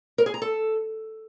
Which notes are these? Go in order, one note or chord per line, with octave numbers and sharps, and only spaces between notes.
A#4
G#4
A#5
A4